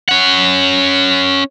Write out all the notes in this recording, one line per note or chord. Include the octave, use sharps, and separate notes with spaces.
C#4 F#5